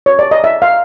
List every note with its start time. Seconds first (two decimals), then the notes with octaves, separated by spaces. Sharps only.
0.06 C#5
0.19 D5
0.31 D#5
0.44 E5
0.62 F5